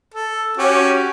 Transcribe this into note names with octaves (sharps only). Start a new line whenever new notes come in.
A4
C#4 F#4 G4